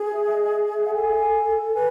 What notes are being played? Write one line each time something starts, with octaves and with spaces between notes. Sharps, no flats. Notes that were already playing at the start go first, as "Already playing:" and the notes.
Already playing: G#4
E5
D#5
E5
F#5
A4 G#5
B4 G#5